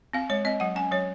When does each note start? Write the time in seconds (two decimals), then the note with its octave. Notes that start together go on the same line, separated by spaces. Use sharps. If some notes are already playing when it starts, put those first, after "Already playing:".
0.13 C4 F5
0.29 G#3 C#5
0.45 C4 D#5
0.60 F#3 F#5
0.76 C#4 G#5
0.91 F#3 C#5